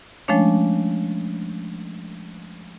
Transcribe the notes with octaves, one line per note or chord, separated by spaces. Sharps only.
F3 G#3 A3 C#4 D4 C#5